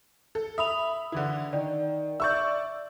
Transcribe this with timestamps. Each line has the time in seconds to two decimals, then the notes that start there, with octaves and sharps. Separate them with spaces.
0.35 A4
0.58 E5 B5 D#6 F7
1.12 D3 E3 E4
1.53 D#3 D5
2.20 D5 E5 C#6 E6 G6